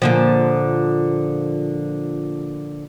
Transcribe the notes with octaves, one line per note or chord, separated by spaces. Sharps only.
A#2 D3 F3